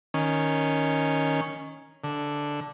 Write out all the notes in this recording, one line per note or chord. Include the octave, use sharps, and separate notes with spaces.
D#3 C#4
D3